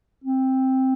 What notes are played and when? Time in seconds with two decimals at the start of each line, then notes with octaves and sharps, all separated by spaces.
0.24 C4